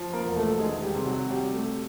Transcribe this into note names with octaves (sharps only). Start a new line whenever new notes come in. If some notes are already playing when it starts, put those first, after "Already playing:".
Already playing: F3
A#3 A#4
E1
A3 A4
D#3 G#3 G#4
G3 G4
C3
F#3 F#4
F#3 G3 G4
A3 A4